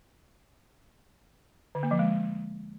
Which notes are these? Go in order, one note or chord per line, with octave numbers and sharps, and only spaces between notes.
D3
A#3
F3
G#3